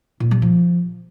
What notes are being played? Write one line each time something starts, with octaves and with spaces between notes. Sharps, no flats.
A#2
G3
F3